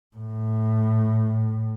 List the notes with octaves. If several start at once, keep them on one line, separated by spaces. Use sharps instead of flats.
A2